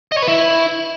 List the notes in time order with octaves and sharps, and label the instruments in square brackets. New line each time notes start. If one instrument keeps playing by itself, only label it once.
[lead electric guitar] D#5
C#5
B4
E4